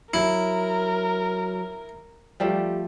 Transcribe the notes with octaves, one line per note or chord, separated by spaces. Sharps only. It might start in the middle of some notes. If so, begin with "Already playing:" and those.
F#3 E4 A#4
F3 G3 A3 G4